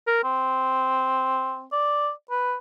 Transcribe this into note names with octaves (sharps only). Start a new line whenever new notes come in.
A#4
C4
D5
B4